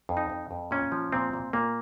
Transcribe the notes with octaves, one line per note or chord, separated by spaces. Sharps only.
F2
D#4
F2
F2
A#2 C#4
F3
A#2 C4
A#2
A#2 A#3